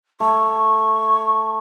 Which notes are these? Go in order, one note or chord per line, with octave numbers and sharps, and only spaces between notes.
A3 C#6